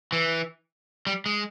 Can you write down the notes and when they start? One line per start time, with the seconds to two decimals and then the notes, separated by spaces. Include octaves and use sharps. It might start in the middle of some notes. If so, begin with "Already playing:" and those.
0.12 E3
1.07 G3
1.26 G#3